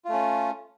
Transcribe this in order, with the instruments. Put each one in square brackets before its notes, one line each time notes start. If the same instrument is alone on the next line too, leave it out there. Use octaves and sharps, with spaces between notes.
[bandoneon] F4
A3
C#4